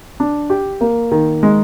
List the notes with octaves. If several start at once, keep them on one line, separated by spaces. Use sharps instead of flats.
D4
G4
A#3
D#3
G#3